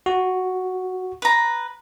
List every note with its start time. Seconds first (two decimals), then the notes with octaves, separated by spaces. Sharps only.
0.06 F#4
1.22 B4 A#5